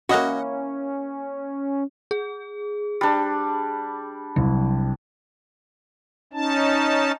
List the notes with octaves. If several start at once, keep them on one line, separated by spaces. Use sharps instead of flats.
A#3 C#4 E4 F#4 D#5 F#5
G#4
G3 D4
C2 F#3
C#4 D#4 A5